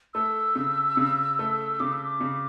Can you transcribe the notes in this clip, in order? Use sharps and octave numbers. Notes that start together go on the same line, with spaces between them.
A3 E6
C#3
C#3
A3
C#3 D6
E6
D6
C#3